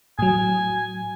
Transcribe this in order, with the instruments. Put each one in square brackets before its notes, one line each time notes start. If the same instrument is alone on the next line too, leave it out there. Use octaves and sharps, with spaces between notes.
[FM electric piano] A2 F#3 [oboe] G#5